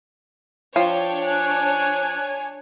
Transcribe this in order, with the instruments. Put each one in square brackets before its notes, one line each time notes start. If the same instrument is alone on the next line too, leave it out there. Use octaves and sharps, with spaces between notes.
[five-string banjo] F3 [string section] D4 C#5 [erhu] G5
[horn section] G#5 [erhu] F#6